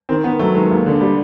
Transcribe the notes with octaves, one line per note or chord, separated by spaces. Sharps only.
D#3 C4
D#3 B3
F#3 A3
D#3 G#3
D#2
D3
G3